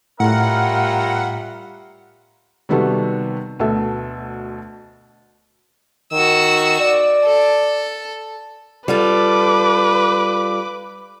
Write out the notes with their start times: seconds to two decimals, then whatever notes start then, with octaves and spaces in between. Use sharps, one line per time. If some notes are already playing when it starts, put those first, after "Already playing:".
0.20 A2 G3 C#4 F4 A#4 E5 F#5
2.69 C3 D#3 G3 B3 F#4 A4
3.59 D2 B2 A4 E5
6.13 D#3 F#4 E6
6.80 D5
7.24 A4
8.88 G3 F4 A4 B4 D6